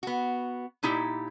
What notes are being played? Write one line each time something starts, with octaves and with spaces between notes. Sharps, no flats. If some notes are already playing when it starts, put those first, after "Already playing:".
B3 F#4
A#2 D#4 E4 G4